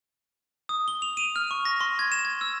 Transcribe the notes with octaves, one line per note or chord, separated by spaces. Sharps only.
D#6
G7
F7
D#7
F6
C#6
A#6
C6
G#6
E7
G#6
E6